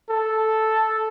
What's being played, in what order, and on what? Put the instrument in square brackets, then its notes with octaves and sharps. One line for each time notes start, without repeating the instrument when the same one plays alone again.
[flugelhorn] A4